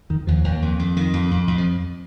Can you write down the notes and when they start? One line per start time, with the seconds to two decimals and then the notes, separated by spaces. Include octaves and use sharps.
0.10 F2 D#3
0.27 D#2 F3
0.44 D#2
0.62 F2
0.79 F2
0.96 F2 D#3
1.13 F2
1.31 F2
1.48 F2
1.58 F3